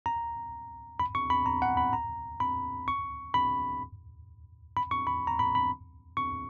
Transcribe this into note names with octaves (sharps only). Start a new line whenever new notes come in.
A#5
B5
C#6
B5
A#5
F#5
B5
A#5
B5
C#6
B5
B5
C#6
B5
A#5
B5
B5
C#6